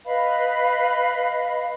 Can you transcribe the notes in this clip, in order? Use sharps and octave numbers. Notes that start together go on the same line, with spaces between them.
B4 D#5 F5 B5